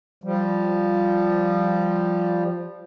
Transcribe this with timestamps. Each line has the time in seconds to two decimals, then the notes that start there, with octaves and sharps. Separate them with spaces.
0.24 F3 G3